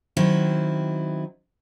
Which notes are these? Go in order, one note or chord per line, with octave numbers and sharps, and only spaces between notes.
D#3 F#3 B3 C4 E4